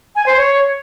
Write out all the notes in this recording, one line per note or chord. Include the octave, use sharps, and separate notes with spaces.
G#5
C5
C#5